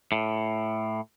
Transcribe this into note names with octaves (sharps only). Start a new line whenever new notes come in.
A2